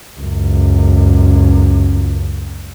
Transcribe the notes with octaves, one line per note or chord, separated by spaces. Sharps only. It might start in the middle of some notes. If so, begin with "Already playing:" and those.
C#2 F#2